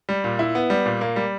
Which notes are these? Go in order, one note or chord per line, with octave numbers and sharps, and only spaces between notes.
G3
A#2
E4
B3
G3
A#2
A#3
G3